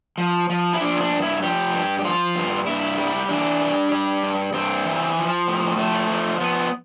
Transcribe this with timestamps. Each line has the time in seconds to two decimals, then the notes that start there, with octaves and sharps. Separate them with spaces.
0.18 F3
0.50 F3
0.73 E4
0.80 F3 D4
0.97 E4
1.01 D4
1.11 G2
1.22 E4
1.42 F3 G4
1.73 G2
1.99 G4
2.04 F3 F4
2.35 G2
2.67 G2 E4
2.98 G3
3.29 E3 D4
3.61 G3
3.92 G3
4.23 G2
4.53 G2 C4
4.85 E3
5.17 F3
5.48 A2
5.78 F3 A3
6.10 F3
6.41 F3 B3